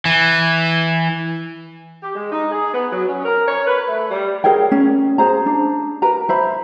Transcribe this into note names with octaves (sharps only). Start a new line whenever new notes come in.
E3
G4
G#3
D#4
G#4
B3
F#3
C#4
A#4
C#5
B4
A3
G3
G#4 A#4 C#5 G5
C#4
G#4 C5 A#5
D4
A#4 B4 A#5
C5 E5 B5